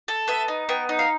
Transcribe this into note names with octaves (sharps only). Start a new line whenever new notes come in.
A4
B3 E5
D#4
B3 G5
D#4
F5